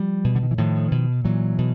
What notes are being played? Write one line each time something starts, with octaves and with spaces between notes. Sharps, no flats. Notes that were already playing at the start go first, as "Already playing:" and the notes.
Already playing: F3 G3
B2
D3
D#3
E3
A2 D#3 F3
B2
A#2 E3 F#3
B2